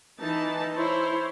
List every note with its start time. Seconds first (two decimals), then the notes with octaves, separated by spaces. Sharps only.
0.20 E3 D#4 A5
0.76 E4 C5 C#5